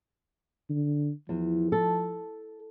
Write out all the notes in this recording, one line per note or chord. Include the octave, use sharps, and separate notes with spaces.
D3
E2 F3
A4